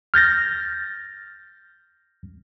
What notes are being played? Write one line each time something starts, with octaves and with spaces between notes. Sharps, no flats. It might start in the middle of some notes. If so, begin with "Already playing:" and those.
F6 G6 A6 A#6